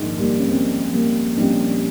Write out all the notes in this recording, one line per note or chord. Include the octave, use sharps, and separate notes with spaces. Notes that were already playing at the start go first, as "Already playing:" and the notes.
Already playing: A#1 G#2 D#3 G#3 D#4
G3 A#3
C#4
G#3 C4
G3 A#3
A#1 A#2 G3 C4 C#4 D#4 G4